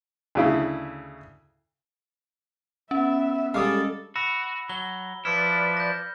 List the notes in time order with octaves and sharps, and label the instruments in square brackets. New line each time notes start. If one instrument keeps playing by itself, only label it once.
[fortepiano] D2 C#3 E4
[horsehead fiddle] B3 E5 [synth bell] C#4
[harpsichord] G3 G#3 [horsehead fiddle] A4 [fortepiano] F5 D6 D#6
[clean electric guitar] F#4 [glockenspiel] B5 E6 A#6
[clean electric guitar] F#3 [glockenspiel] G7
[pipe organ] F3 B4 D5 [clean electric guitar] E4 [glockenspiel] F6 C#7
[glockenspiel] G6 A#6